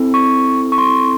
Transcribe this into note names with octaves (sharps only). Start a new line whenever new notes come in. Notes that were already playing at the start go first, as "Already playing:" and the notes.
Already playing: C4 E4 A4
C#6
C#6
C6